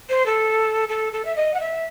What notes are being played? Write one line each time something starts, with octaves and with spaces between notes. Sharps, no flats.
C5
A4
A4
A4
E5
D#5
F#5
E5